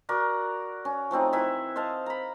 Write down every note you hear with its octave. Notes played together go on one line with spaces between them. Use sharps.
F#4 A#4 D5 F#5
C#4
F3 A3 C4 D#4
E3 E5 G#5
C5 D#5 F5 A5
A#5 B5